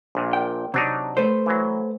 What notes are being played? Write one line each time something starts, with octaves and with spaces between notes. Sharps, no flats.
A#1 A#2
G5
C3 F#3 D4 D#4
A3 B4 C5
E3 F#3